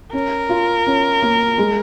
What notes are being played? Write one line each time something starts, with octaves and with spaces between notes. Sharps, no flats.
C#4 A#4
F4
C#4
A#3
G#3